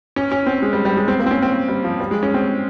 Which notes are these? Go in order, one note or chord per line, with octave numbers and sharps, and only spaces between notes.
C#4
C#4
C4
G#3
G3
G3
G#3
C4
A#3
C4
C#4
C4
G3
F3
G3
G#3
C#4
C4